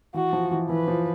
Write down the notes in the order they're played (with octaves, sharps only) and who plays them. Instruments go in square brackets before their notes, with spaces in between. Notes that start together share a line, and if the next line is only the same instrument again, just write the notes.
[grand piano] E3 [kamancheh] F#4
[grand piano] F3
E3
[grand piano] E3 [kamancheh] B4
[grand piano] F3